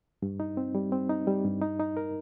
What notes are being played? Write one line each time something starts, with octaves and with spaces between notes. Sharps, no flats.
G2
D#4
C4
G3
C4
D#4
G3
G2
D#4
D#4
A#4